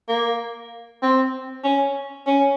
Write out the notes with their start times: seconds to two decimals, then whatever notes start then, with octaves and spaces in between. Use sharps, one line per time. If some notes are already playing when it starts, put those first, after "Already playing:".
0.09 A#3
1.03 C4
1.64 C#4
2.27 C#4